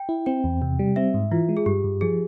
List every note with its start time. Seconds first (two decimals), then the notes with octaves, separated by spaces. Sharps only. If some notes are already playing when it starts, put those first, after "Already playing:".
Already playing: G5
0.09 E4
0.26 C4 G5
0.44 E2
0.62 C3
0.79 G3
0.96 C4 E5
1.14 G#2
1.32 E3 F4
1.49 G#3
1.57 G#4
1.66 G2 G4
1.84 G2
2.01 F3 G#4